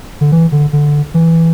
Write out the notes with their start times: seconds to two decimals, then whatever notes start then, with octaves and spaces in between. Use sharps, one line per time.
0.21 D3
0.32 E3
0.52 D3
0.73 D3
1.14 E3